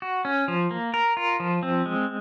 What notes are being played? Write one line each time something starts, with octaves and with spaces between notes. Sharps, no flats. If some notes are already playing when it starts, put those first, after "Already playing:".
F#4
C#4
F3
A#3
A#4
F4
F3
C4
G#3